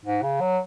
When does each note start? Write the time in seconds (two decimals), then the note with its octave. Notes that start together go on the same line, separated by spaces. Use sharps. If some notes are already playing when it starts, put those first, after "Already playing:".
0.05 G#2
0.23 C#3
0.41 F#3